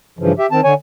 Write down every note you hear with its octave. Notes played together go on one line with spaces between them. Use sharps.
G2 C#3 E3 F3
G4 E5
D#3 C4 A5
D3 C#5 G#5